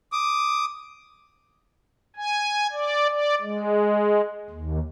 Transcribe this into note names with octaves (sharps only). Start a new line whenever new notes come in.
D6 D#6
G#5
D5
D5
G#3
D#2